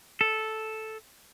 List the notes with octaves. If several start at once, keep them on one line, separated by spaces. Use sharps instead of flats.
A4